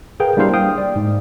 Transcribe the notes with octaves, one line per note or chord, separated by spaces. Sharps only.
G#4 A#4 B4 F5 G5
G3 A#3 D4 E4 C5 F5
F5 G5 D#6
D5
G#2